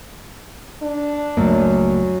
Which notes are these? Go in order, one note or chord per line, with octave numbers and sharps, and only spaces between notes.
D4
C#2 F#2 A3 A#3